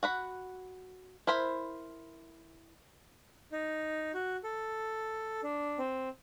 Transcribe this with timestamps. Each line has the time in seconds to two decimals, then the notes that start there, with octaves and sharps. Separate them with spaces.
0.03 F#4 F#5 B5
1.27 E4 A#4 C5 B5
3.52 D#4
4.14 F#4
4.44 A4
5.43 D4
5.79 C4